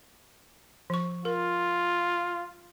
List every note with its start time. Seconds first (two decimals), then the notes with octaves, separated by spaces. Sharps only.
0.90 F3 C#6
1.25 F4 A#4